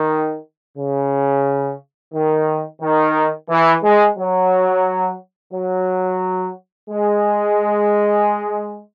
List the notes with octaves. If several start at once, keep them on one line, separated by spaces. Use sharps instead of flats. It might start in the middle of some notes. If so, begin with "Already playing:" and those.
Already playing: D#3
C#3
D#3
D#3
E3
G#3
F#3
F#3
G#3